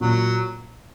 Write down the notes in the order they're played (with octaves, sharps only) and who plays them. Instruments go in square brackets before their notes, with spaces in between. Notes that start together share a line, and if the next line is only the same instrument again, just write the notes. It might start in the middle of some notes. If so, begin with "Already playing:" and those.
[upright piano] A#2 [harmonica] F#3